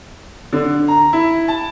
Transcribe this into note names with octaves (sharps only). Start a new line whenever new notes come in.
D3
A#5
E4
A5